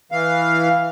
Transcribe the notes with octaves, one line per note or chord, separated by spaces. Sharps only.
E3 F5